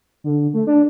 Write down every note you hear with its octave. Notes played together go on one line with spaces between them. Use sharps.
D3
A3
D4